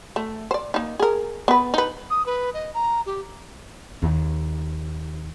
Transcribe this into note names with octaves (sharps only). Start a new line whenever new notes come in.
A3
C5 D5
A#3 D#4
G#4 A#4
B3 B4
D#4 B4
D#6
B4
D#5
A#5
G4
D#2